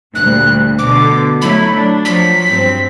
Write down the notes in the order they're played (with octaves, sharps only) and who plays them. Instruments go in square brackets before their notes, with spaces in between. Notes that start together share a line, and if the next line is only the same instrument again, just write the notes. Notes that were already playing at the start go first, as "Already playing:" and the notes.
[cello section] D2 A#2 G3 [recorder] F#6
[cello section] B2 D3 [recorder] D6
[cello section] F#3 A3 E4 [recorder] B5
[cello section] D4
[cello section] F3 F#3 [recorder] B6
[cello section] G2 C4